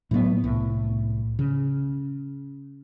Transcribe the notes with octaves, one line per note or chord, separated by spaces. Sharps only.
A2 F#3 G#3 B3
C2 A2
C#3